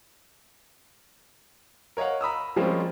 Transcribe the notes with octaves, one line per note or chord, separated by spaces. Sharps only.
A#4 C#5 D#5 F5 F#5
A#5 B5 D#6 E6
F3 G3 G#3 A#3 C4 C#4